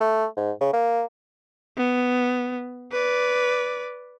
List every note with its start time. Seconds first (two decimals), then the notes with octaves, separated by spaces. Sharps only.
0.01 A3
0.37 G#2
0.61 C#3
0.73 A#3
1.77 B3
2.92 B4 D5